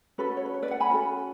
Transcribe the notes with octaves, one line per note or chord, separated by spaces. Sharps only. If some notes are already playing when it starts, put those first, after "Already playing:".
C#4 F#4 A4 B4
C#5
B4
C#5
B4 D5
F#5 A5
G#5 B5
C#4 F#4 A4